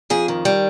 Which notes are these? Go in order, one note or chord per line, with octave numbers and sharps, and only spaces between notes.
F2 G#4
D#3
G3